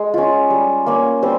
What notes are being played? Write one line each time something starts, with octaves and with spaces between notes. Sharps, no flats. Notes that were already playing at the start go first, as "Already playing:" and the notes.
Already playing: G#3 G#4
C#4 F4
G3
A#3 C#4
G3 C4 C5